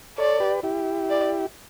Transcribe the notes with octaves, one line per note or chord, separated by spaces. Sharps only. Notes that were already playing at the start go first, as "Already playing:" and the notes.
A4 C#5 D5
G4 B4
E4 G4
D5